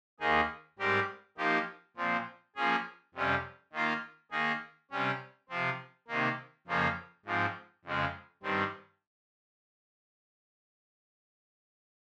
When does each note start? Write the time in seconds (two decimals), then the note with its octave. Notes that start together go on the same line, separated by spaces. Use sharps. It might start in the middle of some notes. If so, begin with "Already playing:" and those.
0.20 D#2 D#3 A#3 D#4 G#4
0.79 G#2 G3 C4 G4 A#4
1.38 F3 A#3 D#4 G4
1.97 A#2 F3 C4
2.56 F3 A#3 C#4 G#4
3.14 F2 C3 G3 C#4
3.72 D#3 A#3 F4 A#4
4.31 D#3 A#3 D#4 G#4
4.91 C3 G3 C#4
5.49 C3 F3 C4
6.08 C3 D#3 A#3
6.67 F2 C#3 F3 A#3 C#4
7.26 G#2 F3 C4
7.85 F2 C#3 G#3
8.43 G2 D#3 G3 C4